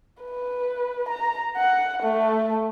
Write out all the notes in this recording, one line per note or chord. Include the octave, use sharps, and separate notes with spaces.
B4
A#5
F#5
A3